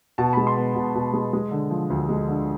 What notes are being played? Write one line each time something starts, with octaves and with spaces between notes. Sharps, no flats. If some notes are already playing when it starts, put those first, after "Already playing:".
B2 A5
G#3 B5
C6
B3
B2
B2
G#3
G#3
D3
F3
D2
G#3
D3